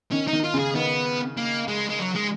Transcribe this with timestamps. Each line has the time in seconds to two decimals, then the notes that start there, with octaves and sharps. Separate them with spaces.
0.12 D#3 C#4
0.27 D#4
0.33 D#3
0.44 F4
0.54 C#3
0.59 G#4
0.75 D#3 B3
1.37 A#3
1.68 G#3
1.89 G#3
1.99 F#3
2.15 G#3